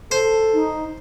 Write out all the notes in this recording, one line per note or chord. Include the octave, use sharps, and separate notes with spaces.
A4 C5
D#4